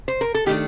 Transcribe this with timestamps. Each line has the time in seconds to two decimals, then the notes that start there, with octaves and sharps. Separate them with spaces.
0.08 C5
0.21 A#4
0.34 A4
0.46 D#3 A3 D4 G4